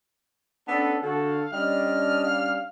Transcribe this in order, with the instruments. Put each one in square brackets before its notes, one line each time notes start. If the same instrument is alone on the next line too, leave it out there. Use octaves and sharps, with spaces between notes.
[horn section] B3 C#4 A4 [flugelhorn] D4 [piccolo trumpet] B4
[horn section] D3 F#4 [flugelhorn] A4 [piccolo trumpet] F5
[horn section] G3 C#4 D4 [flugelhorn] D#5 [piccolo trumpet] F6
[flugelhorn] F5